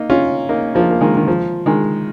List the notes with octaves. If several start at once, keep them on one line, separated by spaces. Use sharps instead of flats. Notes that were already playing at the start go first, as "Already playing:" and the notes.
Already playing: A#3 D#4
C#4 F4
A#3 D#4
F3 A#3
A#3
D#3 G#3
D#3
F3
D#3 G#3